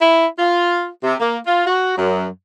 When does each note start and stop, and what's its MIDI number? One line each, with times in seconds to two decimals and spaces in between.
0.01 0.26 64
0.38 0.87 65
1.03 1.13 48
1.19 1.38 58
1.46 1.62 65
1.66 1.96 66
1.96 2.26 42